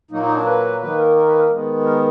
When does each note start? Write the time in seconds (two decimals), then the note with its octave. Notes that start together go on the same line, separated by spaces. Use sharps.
0.11 A#2 F#3 A#3 D#4
0.23 D#4
0.34 D4
0.46 B4
0.81 D#3 A#3 B4
0.98 A#4
1.16 A#4
1.28 B4
1.39 A#4
1.51 D#3 G#3 B3
1.86 A#4